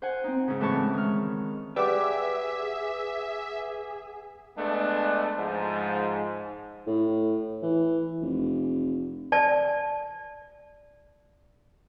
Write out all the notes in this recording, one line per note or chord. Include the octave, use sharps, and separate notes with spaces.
C5 F#5 G#5
C4 D#4
G#2 C#3
A2 E3 G#3 C#5 A5 C#6
G#3
D#3 F6
G4 G#4 B4 D5 E5 F#5 D6
G#3 A3 B3 D4
G#2 F3
A2
E3
F1
D5 A5